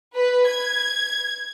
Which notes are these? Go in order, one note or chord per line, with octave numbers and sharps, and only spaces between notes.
B4
G#6